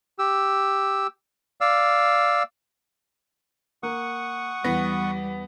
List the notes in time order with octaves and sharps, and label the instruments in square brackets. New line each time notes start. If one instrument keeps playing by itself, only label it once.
[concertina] G4 E6
D5 F5 E6
[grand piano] A#3 [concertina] F#5 C#6 D#6
[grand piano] E2 A#6 [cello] G3 [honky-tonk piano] B3